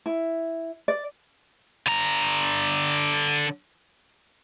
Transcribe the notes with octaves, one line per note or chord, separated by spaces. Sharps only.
E4
D5
D3 A#5